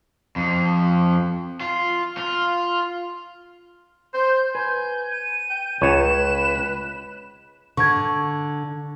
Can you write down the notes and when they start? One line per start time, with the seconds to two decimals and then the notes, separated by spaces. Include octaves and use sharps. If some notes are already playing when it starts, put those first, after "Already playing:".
0.36 F2
1.61 F4
2.18 F4
4.14 C5 G6
4.55 B4 G#5 G6
5.11 D#7
5.50 G5
5.81 C#2 B4 C#5 E7
7.77 D3 C#6 G#6